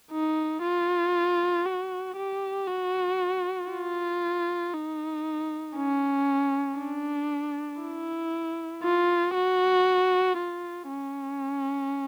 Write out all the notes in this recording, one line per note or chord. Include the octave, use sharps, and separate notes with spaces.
D#4
F4
F#4
G4
F#4
F4
D#4
C#4
D4
E4
F4
F#4
F4
C#4